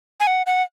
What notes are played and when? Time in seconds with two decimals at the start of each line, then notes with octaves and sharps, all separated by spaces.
0.20 G#5
0.27 F#5
0.46 F#5